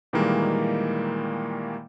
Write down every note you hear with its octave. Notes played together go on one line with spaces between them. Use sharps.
A#2 D#3 E3 G3 G#3 A#3